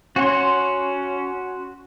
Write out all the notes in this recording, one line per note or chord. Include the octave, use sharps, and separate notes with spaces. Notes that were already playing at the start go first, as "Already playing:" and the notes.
C#4 F#4 F#5 C6